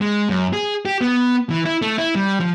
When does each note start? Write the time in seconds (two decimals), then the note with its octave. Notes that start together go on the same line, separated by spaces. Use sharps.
0.01 G#3
0.29 F#2
0.53 G#4
0.85 G4
1.01 B3
1.50 E3
1.65 E4
1.82 A3
1.98 E4
2.15 G3
2.40 F3